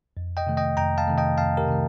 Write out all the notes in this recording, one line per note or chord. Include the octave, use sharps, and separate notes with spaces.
F2
D#5 G5
C3 D#3 A3
D#5 G5
F2 G5 A#5
F5 A5
C3 D#3 A3
D#5 G5
F2 F5 A5
G4 A#4
C3 D#3 A3